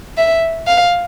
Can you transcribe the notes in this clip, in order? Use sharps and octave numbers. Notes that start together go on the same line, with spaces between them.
E5
F5